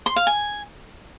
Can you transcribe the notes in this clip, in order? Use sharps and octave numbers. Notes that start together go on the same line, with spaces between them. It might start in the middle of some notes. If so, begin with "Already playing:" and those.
C6
F5
G#5